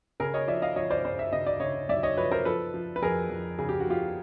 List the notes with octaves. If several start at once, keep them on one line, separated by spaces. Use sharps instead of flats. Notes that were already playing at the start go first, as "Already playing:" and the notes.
C#3 G#4 A#4
C#5 D#5
F3 D5 E5
D#5 F5
F3 C#5 D#5
C5 D5
C#3 C5 D5
E5
C#3 D#5
D5
C#3 C#5 D#5
F#2 D5 E5
C#5 D#5
F3 B4 C#5
A#4 C5
F3 A4 B4
F3
B4
F2 G#4 A#4
F2
C#3 G#4
G4
F#4
F3 F4 G4